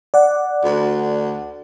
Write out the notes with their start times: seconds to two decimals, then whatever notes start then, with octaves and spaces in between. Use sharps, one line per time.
0.14 D5 F#5
0.64 D2